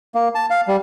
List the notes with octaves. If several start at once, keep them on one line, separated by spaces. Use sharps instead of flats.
A#3
A5
F5
G3